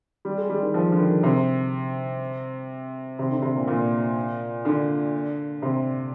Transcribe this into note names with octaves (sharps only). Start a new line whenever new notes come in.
G3
G#3
G3
D#3
F3
D3
D#3
C3
C3
D3
C3
A#2
A#2
D3
C3